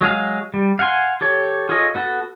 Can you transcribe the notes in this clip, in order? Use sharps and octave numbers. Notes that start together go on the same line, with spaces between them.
F#3 G#3 G#4 F5
G3
F5 F#5 G#5 C6
G4 A4 C#5
F4 G#4 A4 C#5 D#5
B3 F#4 A4